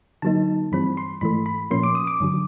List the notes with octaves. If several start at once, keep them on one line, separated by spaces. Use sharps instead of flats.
D3 F#3 A#3 D#4 A5
G2 E3 G3 C4 B5
C6
G#2 E3 A3 B5
B5
A#2 F3 A#3 C#4 C6
D6
D#6
D6
G2 D3 F#3